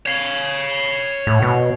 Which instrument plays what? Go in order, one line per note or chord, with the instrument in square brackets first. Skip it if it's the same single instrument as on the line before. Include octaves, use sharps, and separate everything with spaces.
[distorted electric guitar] C#5 F5
[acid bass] A2
B2